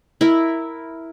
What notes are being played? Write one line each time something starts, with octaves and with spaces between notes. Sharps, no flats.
E4 A#4